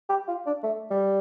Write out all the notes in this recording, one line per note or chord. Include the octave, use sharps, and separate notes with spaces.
G4
F4
D4
A3
G3